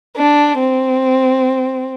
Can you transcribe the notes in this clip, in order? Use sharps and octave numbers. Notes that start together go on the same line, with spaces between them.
D4
C4